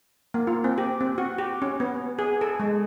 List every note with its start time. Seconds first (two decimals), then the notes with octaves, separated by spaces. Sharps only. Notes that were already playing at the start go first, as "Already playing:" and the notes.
0.34 A#3
0.47 F4
0.64 C4
0.78 G4
1.00 C4
1.18 F#4
1.38 G4
1.62 C#4
1.80 B3
2.19 G#4
2.41 A4
2.60 G#3